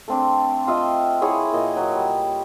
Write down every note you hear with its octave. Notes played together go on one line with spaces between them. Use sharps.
A3 C4 D4
F4 D#5 E5 G5
E4 G#4 C#5 F#5
A#2 D#5
F#3
G3